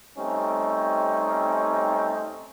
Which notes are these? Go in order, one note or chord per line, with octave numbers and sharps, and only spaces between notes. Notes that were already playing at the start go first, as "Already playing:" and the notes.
G3 A3 C4 C#4 D#4